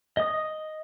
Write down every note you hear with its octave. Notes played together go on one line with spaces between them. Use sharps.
D#5 D#6